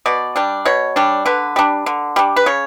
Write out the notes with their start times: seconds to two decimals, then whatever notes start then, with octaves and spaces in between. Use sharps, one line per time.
0.06 B2 D5
0.36 G3 D4
0.65 B2 C#5
0.96 G3 D4
1.26 D3 B4
1.56 G3 D4
1.86 D3
2.16 G3 D4
2.36 B4
2.46 C#3 C#5